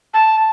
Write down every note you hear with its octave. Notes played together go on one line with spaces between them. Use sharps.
A5